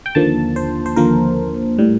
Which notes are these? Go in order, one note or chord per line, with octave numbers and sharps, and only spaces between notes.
G5
D#2 D3 F3 A#3 A5
C5
C5
D#2 D3 F3 A#3 A#4
A2 G3